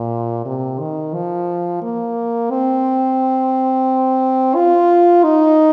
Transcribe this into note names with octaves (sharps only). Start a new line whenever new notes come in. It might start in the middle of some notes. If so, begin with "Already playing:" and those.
Already playing: A#2
C3
D#3
F3
A#3
C4
F4
D#4